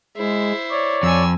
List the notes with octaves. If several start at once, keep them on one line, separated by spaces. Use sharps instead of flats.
G#3 E4 C5
C#5 D5
F2 G#5 E6